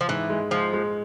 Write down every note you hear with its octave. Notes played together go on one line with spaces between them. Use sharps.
F3
G#2 E3
G#3
F3 G#3
G#3